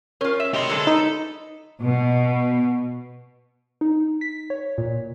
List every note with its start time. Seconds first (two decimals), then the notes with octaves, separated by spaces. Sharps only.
0.21 C#4 F4 A#4 C#5
0.40 E5
0.54 B2 G4 D#5 C6
0.70 D3 F#3 G#3 A4
0.87 D#4 B4
1.83 B2
3.81 D#4
4.21 B6
4.50 C#5
4.78 A#2